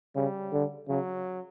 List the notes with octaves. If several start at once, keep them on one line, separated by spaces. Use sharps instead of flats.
C#3 G3
D3
C#3 F#3